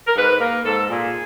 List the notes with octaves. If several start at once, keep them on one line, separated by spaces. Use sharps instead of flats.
A#4
G#2 B4
A#3 A#4
G#2 A4
A#2 G#4